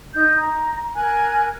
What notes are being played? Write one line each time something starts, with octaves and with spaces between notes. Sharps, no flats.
D#4 G6
A#5
A#4 G#5 F#6 G#6